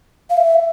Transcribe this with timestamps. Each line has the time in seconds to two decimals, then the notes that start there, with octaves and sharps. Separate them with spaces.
0.30 F5
0.37 E5